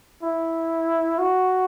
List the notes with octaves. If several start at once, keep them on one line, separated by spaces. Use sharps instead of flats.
E4
F#4